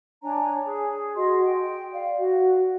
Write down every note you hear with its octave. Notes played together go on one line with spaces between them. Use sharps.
D4 C#5 G#5 A#5
G#4
F#4 G#4 D#5 C6
G5
D5 F5
F#4